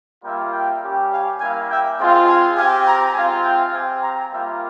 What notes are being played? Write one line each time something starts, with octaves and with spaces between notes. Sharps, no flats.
G3 A#3 F4 E5 G5
E5 G5
G3 C#4 G4
F5 G#5
G3 A#3 E4 F5 G#5
E5 G5
G#3 C4 F4
F5 G#5
C4 G4 F5 G#5
G5 A#5
G#3 C4 F4 F5 G#5
E5 G5
C4 G4 F5 G#5
G5 A#5
G3 A#3 F4 E5 G5